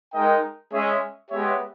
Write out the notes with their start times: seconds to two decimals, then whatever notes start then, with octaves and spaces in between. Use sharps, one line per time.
0.13 G#3 D#4 A#4 D#5 G5
0.71 G#3 C#4 G#4 C#5 E5
1.31 G#3 B3 G4 C#5 E5